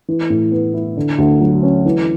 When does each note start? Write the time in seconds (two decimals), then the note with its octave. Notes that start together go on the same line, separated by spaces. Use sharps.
0.08 E3
0.30 A2
0.52 B3
0.74 E4
0.97 D3
1.18 D2
1.41 F#3
1.63 C#4
1.86 E3